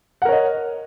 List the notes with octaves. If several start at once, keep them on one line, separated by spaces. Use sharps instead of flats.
A#4 C#5 D#5 F#5